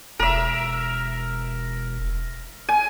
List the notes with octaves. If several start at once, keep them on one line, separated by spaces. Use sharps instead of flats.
E1 A#4 E5
G#5